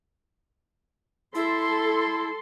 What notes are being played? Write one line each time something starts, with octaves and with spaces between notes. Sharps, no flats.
E4 A4 C6